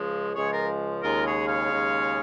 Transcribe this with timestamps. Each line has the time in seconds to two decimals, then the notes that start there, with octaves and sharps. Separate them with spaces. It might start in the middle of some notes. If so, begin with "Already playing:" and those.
Already playing: C#2 C#3 F3 G#3
0.34 C#2 C#3 F3 G#3 G#4 C#5
0.52 F4 A#4
1.02 D#2 C#3 G#3 F4 A#4
1.25 G#4 C#5
1.47 C#5 F5
1.70 D#2 C#3 G#3